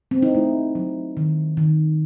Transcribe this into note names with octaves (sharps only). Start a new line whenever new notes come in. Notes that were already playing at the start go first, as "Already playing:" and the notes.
C4
D#4
A3 E4
F#3
D#3
D#3